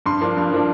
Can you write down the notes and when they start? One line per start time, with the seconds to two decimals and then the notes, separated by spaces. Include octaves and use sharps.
0.06 G2 C6
0.21 F3 A#3 D4
0.37 G2
0.52 F3 A#3 D4